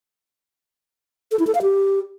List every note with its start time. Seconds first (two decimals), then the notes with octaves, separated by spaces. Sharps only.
1.32 A4
1.39 E4
1.47 A4
1.55 F5
1.62 G4